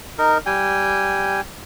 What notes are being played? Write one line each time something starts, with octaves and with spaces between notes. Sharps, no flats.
D#4 A#4
G3 G5 G#5